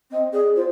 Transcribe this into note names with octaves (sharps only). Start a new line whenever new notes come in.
C4 D#5
G#4 D5
F4 C5